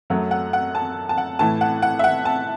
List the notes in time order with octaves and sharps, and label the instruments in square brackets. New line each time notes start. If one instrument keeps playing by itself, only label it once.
[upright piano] F#2 F#3 A3 F#5
F#5
F#5
A5
A5
F#5
A2 E3 A3 A5
F#5
F#5
E5
F#5
A5